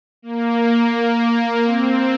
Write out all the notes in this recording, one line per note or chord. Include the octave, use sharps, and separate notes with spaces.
A#3
C4